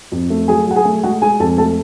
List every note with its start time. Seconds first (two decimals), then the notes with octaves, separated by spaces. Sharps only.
0.12 F2
0.30 A3
0.48 F#3 G#4 G#5
0.67 F#3 F#5
0.76 G#4 G#5
0.85 A3
1.03 G#3 F#4 F#5
1.22 G#3 G#4 G#5
1.40 F2 A4 A5
1.58 A3 A4 A5